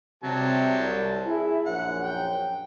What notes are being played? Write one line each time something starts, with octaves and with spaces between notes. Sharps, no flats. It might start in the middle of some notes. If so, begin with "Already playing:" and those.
C3 F#3 G3 A5
C2
E4 G#4
A#1 F#2 F#5
G5